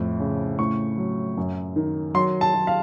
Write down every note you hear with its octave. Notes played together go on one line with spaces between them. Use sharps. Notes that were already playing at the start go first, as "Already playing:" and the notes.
Already playing: F2 A2
C#3
A2 C#6
F#3
F#2
D#3
F#3 C6
A5
F#3
F5